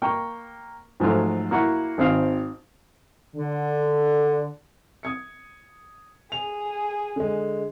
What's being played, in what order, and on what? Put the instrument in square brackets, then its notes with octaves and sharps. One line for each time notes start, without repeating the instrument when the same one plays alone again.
[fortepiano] A#3 G5 C#6
G#2 F3 F#3 A3 F4
A#3 E4 F#4 F#5
G#1 C4 F5
[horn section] D3
[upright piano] D#6 G#6 C#7
[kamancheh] G#4 [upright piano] F7
[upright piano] D3 G#3